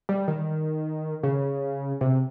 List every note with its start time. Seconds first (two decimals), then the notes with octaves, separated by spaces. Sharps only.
0.09 G3
0.28 D#3
1.23 C#3
2.01 C3